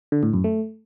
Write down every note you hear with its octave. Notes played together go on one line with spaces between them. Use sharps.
D3
A2
F#2
A3